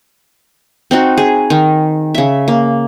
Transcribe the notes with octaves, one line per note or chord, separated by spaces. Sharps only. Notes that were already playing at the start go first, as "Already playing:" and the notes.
C4 D#4 F#4
G#4
D#3
C#3 E5
A#3